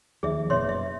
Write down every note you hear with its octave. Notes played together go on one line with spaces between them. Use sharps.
D#2 F3 G#4 E5
F#1 B2 C#5 E5 C6
E5